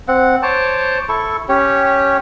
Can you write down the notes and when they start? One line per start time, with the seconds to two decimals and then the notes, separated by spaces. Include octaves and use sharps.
0.08 C4 F#5
0.43 C5 C#5 A5 D6
1.09 E4 A4 C#6
1.49 C#4 G4 C#5